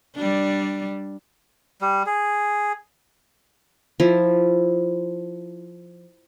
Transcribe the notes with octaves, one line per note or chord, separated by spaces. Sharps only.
G3 D4
G3
G#4
F3 E4